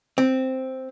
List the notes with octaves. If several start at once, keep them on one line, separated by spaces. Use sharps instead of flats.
C4